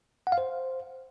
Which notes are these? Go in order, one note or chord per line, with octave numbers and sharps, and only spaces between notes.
F#5
F5
C5